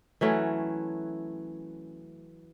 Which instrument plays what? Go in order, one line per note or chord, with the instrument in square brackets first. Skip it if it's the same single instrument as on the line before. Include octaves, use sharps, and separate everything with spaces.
[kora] E3 F#3 A3 C#4